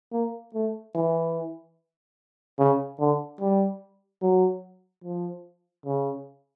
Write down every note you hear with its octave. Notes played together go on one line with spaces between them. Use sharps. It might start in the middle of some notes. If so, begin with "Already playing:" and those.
A#3
A3
E3
C#3
D3
G3
F#3
F3
C#3